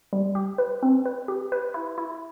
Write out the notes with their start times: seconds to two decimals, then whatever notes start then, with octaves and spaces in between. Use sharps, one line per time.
0.13 G3
0.35 G4
0.58 B4
0.83 C4
1.06 B4
1.28 G4
1.52 B4
1.74 E4
1.98 E4